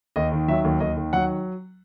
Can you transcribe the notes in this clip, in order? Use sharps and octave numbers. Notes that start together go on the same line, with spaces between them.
D#2 D#5
D#3
F#3 E5
D#2
D#2 D#5
D#3
F#3 F#5